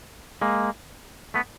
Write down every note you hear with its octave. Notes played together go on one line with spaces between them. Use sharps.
G#3 A#3
A3 B3